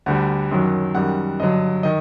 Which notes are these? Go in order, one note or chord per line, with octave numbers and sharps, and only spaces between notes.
D2 D3 G3 F#5
F#2 D#3 F#3
F#2 D#3 G3 F#5
G2 D3 F#3 D#5
D#3 D#5